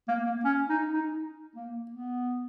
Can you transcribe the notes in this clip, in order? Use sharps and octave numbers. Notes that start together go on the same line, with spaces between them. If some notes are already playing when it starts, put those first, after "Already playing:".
A#3
A#3
C#4
D#4
D#4
A#3
B3